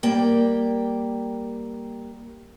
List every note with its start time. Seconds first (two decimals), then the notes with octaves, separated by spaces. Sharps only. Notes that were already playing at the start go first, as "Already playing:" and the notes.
0.03 G3 A#3 G5